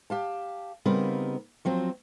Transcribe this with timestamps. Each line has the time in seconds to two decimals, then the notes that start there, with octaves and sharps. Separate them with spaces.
0.10 G4 F5 A5
0.85 C#3 G3 B3 C4 D#4 A#4
1.65 F3 F#3 C4